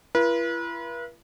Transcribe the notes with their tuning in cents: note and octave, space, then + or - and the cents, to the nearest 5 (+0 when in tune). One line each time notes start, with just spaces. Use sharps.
E4 +45 B4 -40